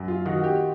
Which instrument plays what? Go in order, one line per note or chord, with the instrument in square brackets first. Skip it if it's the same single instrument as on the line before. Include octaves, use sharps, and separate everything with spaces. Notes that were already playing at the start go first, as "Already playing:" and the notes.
Already playing: [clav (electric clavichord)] F#2
[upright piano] F4
[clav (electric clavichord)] D#3 [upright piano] F#4
[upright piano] F#4
G4